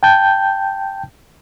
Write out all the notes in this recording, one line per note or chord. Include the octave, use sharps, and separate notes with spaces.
G5 A5 G6